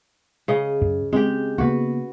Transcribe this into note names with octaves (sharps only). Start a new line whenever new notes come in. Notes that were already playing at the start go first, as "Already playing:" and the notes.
C#3 D#5
F#2
G#3 C4 G4
C#3 A#3 B3 F#4 B4